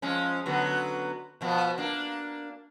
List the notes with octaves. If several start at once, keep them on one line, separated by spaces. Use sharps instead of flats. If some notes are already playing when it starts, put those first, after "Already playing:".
F3 G#3 C#4
D3 F#3 B3
B2 F3 B3
A#3 D4